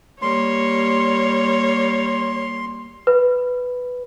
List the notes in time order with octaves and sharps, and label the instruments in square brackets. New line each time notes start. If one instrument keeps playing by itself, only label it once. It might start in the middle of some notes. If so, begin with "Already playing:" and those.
[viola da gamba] G3 A#3 [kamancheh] C#5 [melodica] C6
[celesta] B4